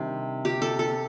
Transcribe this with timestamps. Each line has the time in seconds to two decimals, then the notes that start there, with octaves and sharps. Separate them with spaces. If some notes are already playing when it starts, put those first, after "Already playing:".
Already playing: C3 D#3 G3 D4
0.45 G4
0.62 A4
0.79 A4